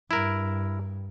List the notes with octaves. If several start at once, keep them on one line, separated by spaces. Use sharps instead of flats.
G2 E4 A#4